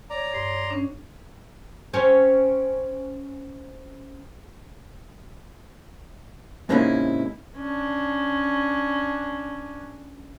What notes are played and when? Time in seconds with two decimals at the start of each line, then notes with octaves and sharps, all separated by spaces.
0.10 C#5 D5 A#5
0.34 G2 C6
0.70 C#4 D4
1.93 C4 C#4 C5
6.69 G#2 C3 A#3 C#4 D#4 E4
7.57 C#4 D4